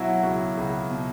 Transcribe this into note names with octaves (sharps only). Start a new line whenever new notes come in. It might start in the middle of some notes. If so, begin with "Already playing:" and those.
Already playing: B2 F#3 E4 F#4
C#2 F#4
C#2
B2